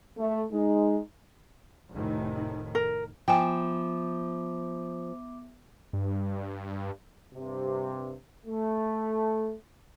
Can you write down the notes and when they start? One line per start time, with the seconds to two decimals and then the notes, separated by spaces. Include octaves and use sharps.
0.18 A3
0.52 G#3 D#4
1.94 F1 A2 D#3
2.75 A#4
3.28 F3 B3 E5 G5 G#5 D6
5.93 G2
7.35 G2 C3
8.46 A3